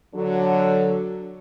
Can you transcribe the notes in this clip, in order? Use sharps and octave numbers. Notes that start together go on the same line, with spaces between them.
D3 F#3